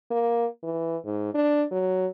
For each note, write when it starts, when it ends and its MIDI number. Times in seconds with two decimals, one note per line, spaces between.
0.11 0.46 58
0.63 0.97 52
1.05 1.33 44
1.34 1.64 62
1.72 2.07 54